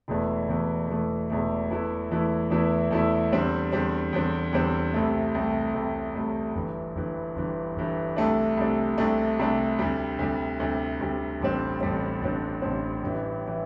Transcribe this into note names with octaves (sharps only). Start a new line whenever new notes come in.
E1 E2 E3 A3
E1 E2 E3 A3
E1 E2 E3 A3
E1 E2 E3 A3
E2 E3 A3 E4
E2 E3 A3 E4
E2 E3 A3 E4
E2 E3 A3 E4
E2 D3 G3 C4
E2 D3 G3 C4
E2 D3 G3 C4
E2 D3 G3 C4
C2 C3 A3
C2 C3 A3
C2 C3 A3
C2 C3 A3
G1 G2 E3
G1 G2 E3
G1 G2 E3
G1 G2 E3
C2 C3 A3 D4
C2 C3 A3 D4
C2 C3 A3 D4
C2 C3 A3 D4
D2 C3 G3
D2 C3 G3
D2 C3 G3
D2 C3 G3
A1 G2 D3 G3 C4
A1 G2 D3 G3 C4
A1 G2 D3 G3 C4
A1 G2 D3 G3 C4
A1 G2 E3
E3